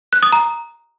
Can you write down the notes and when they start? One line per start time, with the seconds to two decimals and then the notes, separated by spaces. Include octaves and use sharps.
0.13 F#6
0.23 D#6
0.32 A#5